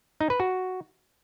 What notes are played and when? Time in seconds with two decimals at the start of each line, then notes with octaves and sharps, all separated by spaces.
0.21 D#4
0.30 B4
0.40 F#4